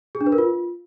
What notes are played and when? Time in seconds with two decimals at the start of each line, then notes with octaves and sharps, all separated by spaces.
0.15 G#4
0.21 D4
0.26 B4
0.32 A#4
0.38 F4